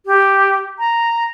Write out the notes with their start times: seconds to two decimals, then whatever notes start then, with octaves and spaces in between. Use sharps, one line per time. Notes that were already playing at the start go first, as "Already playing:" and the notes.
0.06 G4
0.79 A#5